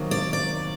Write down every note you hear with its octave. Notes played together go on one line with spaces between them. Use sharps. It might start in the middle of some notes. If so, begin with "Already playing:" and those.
Already playing: C3 D#3 F#3 A#3
D5
D5